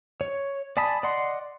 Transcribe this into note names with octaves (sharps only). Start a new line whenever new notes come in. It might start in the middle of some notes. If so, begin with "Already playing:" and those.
C#5
D5 G#5 A5 B5 D#6
D5 D#5 F#5 C6